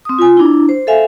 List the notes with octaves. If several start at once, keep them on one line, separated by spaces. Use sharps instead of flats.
C4 D#6
F4 G#5
D4 E4
C5
A4 C5 E5 F5 G#5